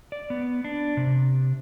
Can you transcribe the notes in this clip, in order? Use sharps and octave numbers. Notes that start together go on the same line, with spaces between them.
D5
B3
D4
C3